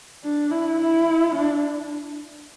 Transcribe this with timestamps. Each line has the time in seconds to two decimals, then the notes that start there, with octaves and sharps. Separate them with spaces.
0.23 D4
0.51 E4
0.79 E4
1.35 D4